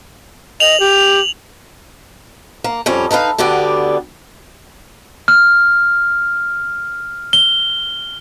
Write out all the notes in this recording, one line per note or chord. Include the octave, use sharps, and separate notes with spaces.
D#5 F7 F#7
G4
A#3
F2 G3 C#4
D#4 A4 B4 F5
D2 D3 B3 G4 D5
F6
G7